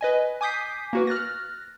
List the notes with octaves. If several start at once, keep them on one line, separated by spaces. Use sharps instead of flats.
B4 D#5 G#5
G#5 D6 D#6 G6 B6 C7
A#3 F#4 B4
F6 F#6 A6 A#6